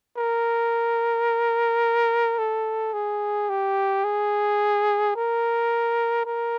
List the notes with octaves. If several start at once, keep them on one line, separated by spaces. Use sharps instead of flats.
A#4
A4
G#4
G4
G#4
A#4
A#4